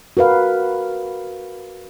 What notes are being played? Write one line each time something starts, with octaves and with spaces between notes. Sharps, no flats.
F#4 A#4 B4 F5